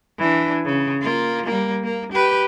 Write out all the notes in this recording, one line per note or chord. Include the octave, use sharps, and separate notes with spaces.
E3 D4
C#3
A#3 F4
G3 A#3
A#3
G4 B4